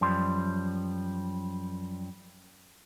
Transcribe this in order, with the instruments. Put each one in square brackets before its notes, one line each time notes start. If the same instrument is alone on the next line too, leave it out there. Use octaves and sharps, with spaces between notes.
[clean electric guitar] F#2 F3 G3 C6